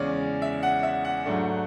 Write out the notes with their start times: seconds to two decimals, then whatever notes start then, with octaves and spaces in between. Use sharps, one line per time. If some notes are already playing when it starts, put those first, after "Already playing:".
Already playing: E2 C#3 G#3 C#4 D5
0.42 E5
0.63 F#5
0.83 E5
1.05 F#5
1.25 G#2 F#3 A3 D4